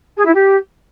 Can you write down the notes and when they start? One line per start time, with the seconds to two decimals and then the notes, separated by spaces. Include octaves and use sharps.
0.17 G#4
0.26 E4
0.34 G4